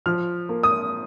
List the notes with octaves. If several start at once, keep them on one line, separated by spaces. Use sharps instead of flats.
F3 F6
A#3
D#6